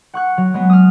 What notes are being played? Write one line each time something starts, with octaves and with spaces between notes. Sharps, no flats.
F#5 C#6 F#6
F#3
G#3 B3
D#6 F6